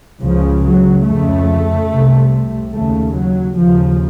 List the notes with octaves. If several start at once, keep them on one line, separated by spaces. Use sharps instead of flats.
C#2 C#3 F3
F#3
F2 C#3 A3
C2 C3
D#2 C#3 A3
F#3
D#2 C#3 F3